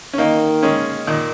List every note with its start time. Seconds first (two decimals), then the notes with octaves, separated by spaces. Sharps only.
0.13 C#4
0.18 D#3 A#3 D#4
0.63 G#3 C#4
1.07 A#2 D#3